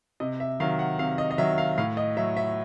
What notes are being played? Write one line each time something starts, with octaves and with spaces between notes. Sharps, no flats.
C3 D#5
E5
D#3 F#3 F5
F#5
C3 F5
D#5
D#5
D#3 F#3 E5
F5
A2 F5
D#5
F#3 E5
E5